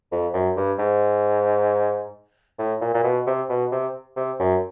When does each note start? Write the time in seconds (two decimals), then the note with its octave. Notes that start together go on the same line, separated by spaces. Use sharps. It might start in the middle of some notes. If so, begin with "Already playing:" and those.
0.12 F2
0.34 F#2
0.57 G2
0.79 G#2
2.59 A2
2.81 A#2
2.94 A#2
3.04 B2
3.27 C3
3.49 B2
3.72 C3
4.16 C3
4.39 F#2